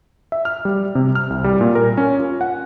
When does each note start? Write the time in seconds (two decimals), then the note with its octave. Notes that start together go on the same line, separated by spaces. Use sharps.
0.32 E5
0.45 F6
0.65 G3
0.95 C3
1.15 F6
1.30 C2
1.44 G3
1.61 A#2
1.75 A#4
1.97 C#4
2.20 F4
2.41 F#5